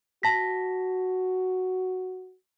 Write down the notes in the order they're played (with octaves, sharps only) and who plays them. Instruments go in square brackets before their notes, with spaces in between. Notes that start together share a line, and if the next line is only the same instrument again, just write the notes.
[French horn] F#4 [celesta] A5 A#6 B6